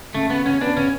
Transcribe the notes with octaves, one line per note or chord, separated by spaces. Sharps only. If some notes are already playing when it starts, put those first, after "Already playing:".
C#3 A3
C#3 B3
C#3 C#4
B3 D4
C#3 C#4